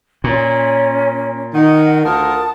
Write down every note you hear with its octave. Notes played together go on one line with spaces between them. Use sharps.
A#2 C#4
D#3 D#5 F#5
D2 F4 A#4 F#5 A5 D#6